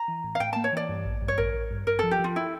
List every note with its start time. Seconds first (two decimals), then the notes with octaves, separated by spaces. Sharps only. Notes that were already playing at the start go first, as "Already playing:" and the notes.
Already playing: A#5
0.08 E3
0.24 A2
0.35 F5
0.40 A2 G5
0.53 A#3 A5
0.64 C#5
0.73 E3 D5
0.89 G2
1.05 A1
1.22 G2
1.28 C#5
1.38 A1 A#4
1.54 A1
1.71 G2
1.87 G2 A#4
1.99 F3 A4
2.11 G4
2.20 F3 F4
2.36 E4